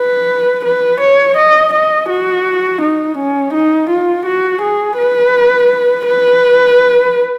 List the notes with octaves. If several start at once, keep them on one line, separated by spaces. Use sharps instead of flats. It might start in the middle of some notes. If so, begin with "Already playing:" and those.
Already playing: B4
B4
C#5
D#5
D#5
F#4
D#4
C#4
D#4
F4
F#4
G#4
B4
B4